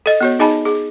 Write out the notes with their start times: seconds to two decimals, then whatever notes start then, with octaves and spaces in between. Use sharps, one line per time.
0.06 A4 D#5
0.21 B3 F#4 C#5
0.39 D#4 G#4 D#5 G#5 A5 B5
0.65 G#4